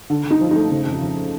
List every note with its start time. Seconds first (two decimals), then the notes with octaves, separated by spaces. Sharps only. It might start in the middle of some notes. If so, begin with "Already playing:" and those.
0.10 D3
0.25 D3
0.30 D#4
0.41 F3
0.51 A3 D#4
0.71 C#3
0.86 F2
1.02 F2